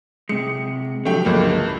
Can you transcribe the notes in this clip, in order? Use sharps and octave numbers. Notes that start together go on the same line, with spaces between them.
C3 G#3 C#7
D3 F3 F#3 A3 G4 G5
C#2 G2 A#3